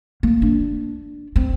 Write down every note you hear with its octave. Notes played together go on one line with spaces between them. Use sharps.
A#3
D4
C4